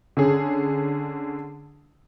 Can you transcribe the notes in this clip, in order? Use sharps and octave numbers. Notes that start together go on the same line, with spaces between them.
D3 C#4 G#4